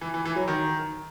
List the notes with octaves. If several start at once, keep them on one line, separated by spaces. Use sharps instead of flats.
E3
E3
E3
F#3
D#3